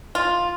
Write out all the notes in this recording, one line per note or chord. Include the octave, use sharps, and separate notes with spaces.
F4